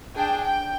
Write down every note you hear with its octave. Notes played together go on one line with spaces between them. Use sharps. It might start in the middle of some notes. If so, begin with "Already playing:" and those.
D4 G#4 G5
G5